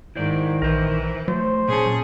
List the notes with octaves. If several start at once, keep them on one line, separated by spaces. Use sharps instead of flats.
G#2 D#3 E4 C5 D5
A#1 E3 A#4 C5
F#3 A3 C5
A#2 C#4 G#4 A5